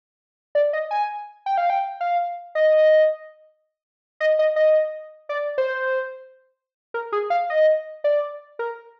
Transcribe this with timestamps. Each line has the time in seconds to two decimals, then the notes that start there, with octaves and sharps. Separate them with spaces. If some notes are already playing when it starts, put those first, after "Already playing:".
0.55 D5
0.73 D#5
0.91 G#5
1.46 G5
1.58 F5
1.70 G5
2.01 F5
2.55 D#5
4.20 D#5
4.39 D#5
4.56 D#5
5.29 D5
5.58 C5
6.94 A#4
7.12 G#4
7.30 F5
7.50 D#5
8.04 D5
8.59 A#4